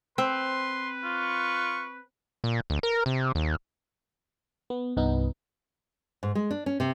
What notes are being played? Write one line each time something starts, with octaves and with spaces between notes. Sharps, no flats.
C4 B4 C6
F4 C#6
A#2
D2
A#4
C3
D#2
B3
C2 G2 B3 D#4
G#2
G#3
D4
C#4
C3